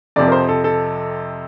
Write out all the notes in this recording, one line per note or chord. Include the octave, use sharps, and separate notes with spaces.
F2 C3 F3 D5
A#4
C5
A4
A4